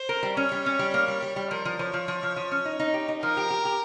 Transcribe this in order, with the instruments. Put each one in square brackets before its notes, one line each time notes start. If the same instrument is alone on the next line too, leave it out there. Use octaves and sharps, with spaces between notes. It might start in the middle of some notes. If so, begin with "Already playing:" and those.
Already playing: [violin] C5
[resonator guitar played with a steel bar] A#4
G3
[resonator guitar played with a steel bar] C#4 [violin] C#5
[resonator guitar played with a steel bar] G3
C#4
G3
A#3
G3
G3
G3
[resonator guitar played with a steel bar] F3 [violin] A#4
[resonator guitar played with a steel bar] F3
[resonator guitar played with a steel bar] F3 [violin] C#5
[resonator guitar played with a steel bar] F3
F3
F3
F3
C#4
D#4
D#4
G4
D#4
[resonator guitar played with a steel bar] F3 [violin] A#4
[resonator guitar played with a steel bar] G4
G4
G4